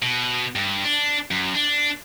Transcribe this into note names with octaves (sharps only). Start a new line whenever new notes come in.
B2
G2
D4
F#2
D4